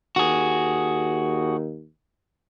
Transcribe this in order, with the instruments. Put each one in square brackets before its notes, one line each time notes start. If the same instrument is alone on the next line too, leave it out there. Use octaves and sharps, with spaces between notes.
[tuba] D#2 [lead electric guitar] F#4 G#4